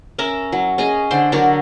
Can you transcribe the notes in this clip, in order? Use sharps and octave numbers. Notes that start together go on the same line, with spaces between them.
C#4 A#4 E5 A#5
F#3
C#4 G#4 D#5 G#5
D3 C5 G5 C6
D3 F#3 A#4 C#5